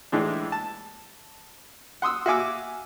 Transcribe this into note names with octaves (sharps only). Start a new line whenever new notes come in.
A2 E3 G#3 D4
A5
F#5 C6 D#6 E6
F#4 E5 F5 G#5 D6 E6